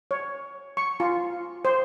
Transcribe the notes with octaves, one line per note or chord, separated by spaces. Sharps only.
C#5
C#6
F4
C5